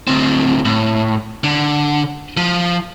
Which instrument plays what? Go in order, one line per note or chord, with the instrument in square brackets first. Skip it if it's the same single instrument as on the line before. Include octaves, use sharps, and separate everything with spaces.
[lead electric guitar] D2 C4
A2
D3
F3